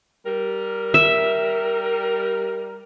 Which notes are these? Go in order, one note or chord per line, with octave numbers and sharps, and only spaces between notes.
G3 A#4
E5